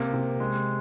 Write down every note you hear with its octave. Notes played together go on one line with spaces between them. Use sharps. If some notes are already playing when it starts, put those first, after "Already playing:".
Already playing: C3 A#3
C3
G#3